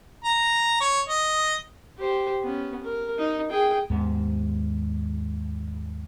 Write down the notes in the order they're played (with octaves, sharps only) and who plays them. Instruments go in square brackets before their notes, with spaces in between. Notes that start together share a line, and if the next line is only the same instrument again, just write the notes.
[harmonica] A#5
C#5
D#5
[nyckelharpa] G4 C5
B3 C#4
A#4
D#4
G#4 G5
[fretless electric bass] D#2 G#2 B3